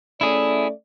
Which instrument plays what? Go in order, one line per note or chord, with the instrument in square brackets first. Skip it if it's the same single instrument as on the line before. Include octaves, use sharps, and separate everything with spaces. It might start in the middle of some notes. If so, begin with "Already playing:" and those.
[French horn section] A3 C#4 D5 [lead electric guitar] E4 G#4